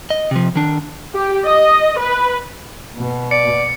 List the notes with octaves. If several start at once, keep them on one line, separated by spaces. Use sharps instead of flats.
D#5
C3 F3
D#3 D4
G4
D#5
B4
B2
D5 C#7